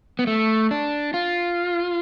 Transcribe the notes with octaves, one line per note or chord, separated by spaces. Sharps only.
B3
A3
D4
F4